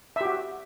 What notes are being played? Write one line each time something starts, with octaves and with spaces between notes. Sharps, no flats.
F#4 G4 E5